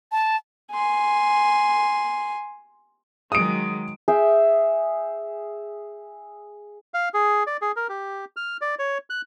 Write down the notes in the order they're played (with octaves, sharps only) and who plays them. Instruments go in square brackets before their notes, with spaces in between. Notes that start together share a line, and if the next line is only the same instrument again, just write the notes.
[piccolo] A5
[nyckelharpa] G#5 C6
[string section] D#3 F#3 G#3 [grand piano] D#6 D7
[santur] G#4 E5 G5
[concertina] F5
G#4
D5
G#4
A#4
G4
F6
D5
C#5
F#6